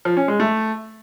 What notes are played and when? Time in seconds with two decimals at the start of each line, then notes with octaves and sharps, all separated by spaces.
0.05 F3
0.17 C#4
0.28 G#3
0.40 A3